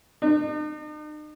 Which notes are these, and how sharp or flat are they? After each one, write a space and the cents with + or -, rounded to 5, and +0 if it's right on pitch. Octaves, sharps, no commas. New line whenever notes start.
D#4 -45